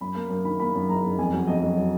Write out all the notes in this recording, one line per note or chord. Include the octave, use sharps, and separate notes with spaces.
F#2 B5
A#3
F#2
D#3 B5
A#3 B5
F#2
F#1 A#5
F#1
F2 G#5
F#3
F2 D#5
F#3
F#3